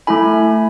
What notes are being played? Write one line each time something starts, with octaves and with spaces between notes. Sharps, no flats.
A3 E4 A4 G#5 B5